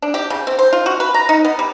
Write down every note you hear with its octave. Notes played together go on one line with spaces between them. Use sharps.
D4
G4
C#3
C4
C5
F4
F#4
B4
A#5
D#4
B3
G3